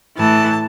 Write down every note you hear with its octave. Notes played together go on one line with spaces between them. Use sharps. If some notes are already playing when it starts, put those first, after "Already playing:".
A2 E3 A5